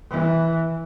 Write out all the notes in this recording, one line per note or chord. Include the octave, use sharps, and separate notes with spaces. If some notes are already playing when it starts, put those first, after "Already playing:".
E3